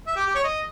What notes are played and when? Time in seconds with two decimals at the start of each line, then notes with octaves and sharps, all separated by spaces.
0.07 E5
0.16 G4
0.26 G4
0.35 C#5
0.44 D#5